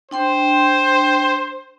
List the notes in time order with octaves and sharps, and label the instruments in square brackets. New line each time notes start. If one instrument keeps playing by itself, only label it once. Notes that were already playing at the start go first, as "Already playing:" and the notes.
[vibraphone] D4 G5 C6 [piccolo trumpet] C5